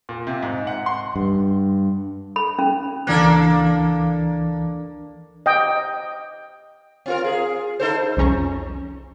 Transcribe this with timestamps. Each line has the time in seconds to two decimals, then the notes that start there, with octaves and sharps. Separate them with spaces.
0.09 A#2
0.27 C3
0.43 G#2
0.67 F#5
0.86 C6
1.16 G2
2.36 B5
2.59 C#4
3.07 C#2 E3 A#3 D4 A4 F#6
5.46 D#5 G5
7.06 C4 F4 A#4
7.25 G#4
7.80 D#4 A4 C5
8.17 C2 F2 C#4 A#5 C#6